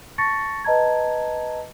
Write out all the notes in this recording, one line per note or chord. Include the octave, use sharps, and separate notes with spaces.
A5 C#6 A6 A#6 C#7
B4 D#5 A5 A#5 G#6